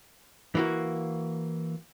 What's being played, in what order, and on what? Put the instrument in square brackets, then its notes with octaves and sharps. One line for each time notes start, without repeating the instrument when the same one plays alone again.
[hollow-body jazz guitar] E3 A#3 F#4